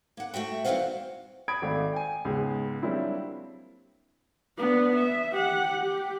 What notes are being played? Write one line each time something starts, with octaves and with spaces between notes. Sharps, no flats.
A#3 F#5
A3 F#4 E5 G5
G2 E3 B3 C4 F5 F#5
B5 D#6 G#6 D7
G#1 A3 D5 F5
G5 G#5
C#2 G#2 G#3 B3
F#3 G3 A#3 C4 D4 E4
B3 D4
E5
G4 F#5
G4